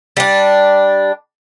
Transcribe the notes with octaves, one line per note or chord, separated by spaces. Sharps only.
G3 D4